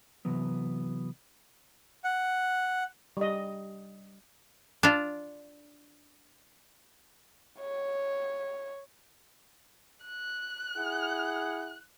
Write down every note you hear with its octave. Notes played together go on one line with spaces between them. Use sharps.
C3 E3 F#3 B3
F#5
G3 D#5
D4 F4
C#5
F#6
E4 G#4 F#5